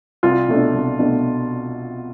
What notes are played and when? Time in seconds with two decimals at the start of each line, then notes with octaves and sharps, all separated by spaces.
0.23 C2 F4
0.48 B2 A3 D4
0.74 C2
0.99 B2 A3 D4